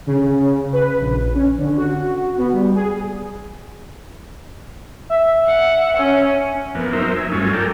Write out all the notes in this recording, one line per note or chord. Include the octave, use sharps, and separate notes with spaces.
C#3
B4
A#1
C#4
D3
F#4
B3
G3
G#4
E5
F#5
C#4
F2 A#3 B3
F#3 D#4 A#4 C5 E5
E5 G#5
G2 F#3 A3 C#4 F4 G#5
A4 A#4 D5 G5